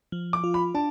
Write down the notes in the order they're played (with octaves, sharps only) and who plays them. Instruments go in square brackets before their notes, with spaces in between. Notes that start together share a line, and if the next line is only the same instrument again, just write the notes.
[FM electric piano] F3
[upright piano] D6
[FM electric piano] F4
[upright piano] B5
[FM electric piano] D4 [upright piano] A5